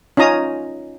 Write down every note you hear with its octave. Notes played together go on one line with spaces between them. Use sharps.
C#4 D#4 F4 A#5 D#6